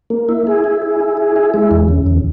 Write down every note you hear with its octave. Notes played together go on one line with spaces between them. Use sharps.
A#3
E4
G#4
E4
G#4
E4
G#4
E4
G#3
E2
C#3
E2